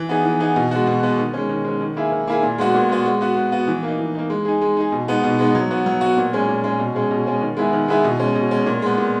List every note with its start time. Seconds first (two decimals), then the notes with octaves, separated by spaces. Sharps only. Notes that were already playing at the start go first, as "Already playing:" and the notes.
Already playing: E3
0.09 B3 D#4 G#4
0.25 E3
0.40 B3 D#4 G#4
0.56 B2
0.71 G#3 B3 F#4
0.87 B2
1.03 G#3 B3 F#4
1.18 D#3
1.34 G#3 C#4
1.49 D#3
1.65 G#3 C#4
1.81 D#3
1.96 A#3 E4 G#4
2.12 D#3
2.28 A#3 E4 G#4
2.43 A#2
2.58 G#3 B3 F#4
2.74 A#2
2.89 G#3 B3 F#4
3.06 G#3
3.21 B3 F#4
3.37 G#3
3.52 B3 F#4
3.68 E3
3.83 A#3 D#4
3.99 E3
4.15 A#3 D#4
4.30 G#3
4.45 D#4 G#4
4.62 G#3
4.77 D#4 G#4
4.92 B2
5.08 G#3 B3 D#4
5.23 B2
5.39 G#3 B3 D#4
5.55 F#3
5.71 B3 F#4
5.86 F#3
6.01 B3 F#4
6.17 A#2
6.33 G#3 C#4 G#4
6.48 A#2
6.64 G#3 C#4 G#4
6.79 B2
6.95 G#3 C#4 G#4
7.11 B2
7.26 G#3 C#4 G#4
7.41 D#3
7.57 G#3 B3 E4 G#4
7.73 D#3
7.88 G#3 B3 E4 G#4
8.04 B2
8.20 G#3 C#4
8.36 B2
8.51 G#3 C#4
8.66 A#2
8.82 G#3 B3
8.98 A#2